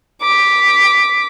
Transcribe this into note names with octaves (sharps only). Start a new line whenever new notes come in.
D6 B6